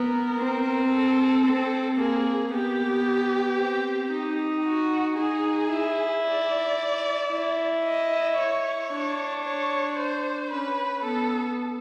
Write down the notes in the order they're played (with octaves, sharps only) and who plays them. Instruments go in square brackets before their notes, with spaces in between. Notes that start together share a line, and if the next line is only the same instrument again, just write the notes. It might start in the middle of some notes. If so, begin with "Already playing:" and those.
Already playing: [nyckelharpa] B3 [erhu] A#4
[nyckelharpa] C4
[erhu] A4
[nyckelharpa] C4
[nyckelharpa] A#3 [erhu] G#4
[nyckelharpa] B3 [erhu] G4
[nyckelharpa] C4
D#4
[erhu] F#4
[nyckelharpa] D#4 [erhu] G#4
[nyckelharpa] E4
[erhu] D5
[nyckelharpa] E4
[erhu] D#5
C#5
[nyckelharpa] D4
[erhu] C#5
C5
[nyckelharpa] C#4 [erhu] B4
[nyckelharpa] B3 [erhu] A4